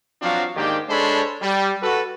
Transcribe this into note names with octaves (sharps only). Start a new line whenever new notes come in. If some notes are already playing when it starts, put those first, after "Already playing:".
F3 F#3 C4 D4 F#4 F5
G#2 D#3 A#3 D4 G4
G#3 D4 A4 C5 C#5 B5
G3
F#4 A4 B4